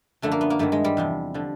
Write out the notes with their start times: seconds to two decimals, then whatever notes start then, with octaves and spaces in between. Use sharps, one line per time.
0.22 F#2 D3 F3 A3
0.32 A#3
0.41 B3
0.50 A#3
0.59 G2 D#3 F#3 A3
0.72 G#3
0.84 G3
0.97 E2 C3 F3
1.34 D3 F3